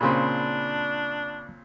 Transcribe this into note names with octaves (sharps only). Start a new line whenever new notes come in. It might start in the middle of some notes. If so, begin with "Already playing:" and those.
A#2 C#3 C4 D4 B5 C6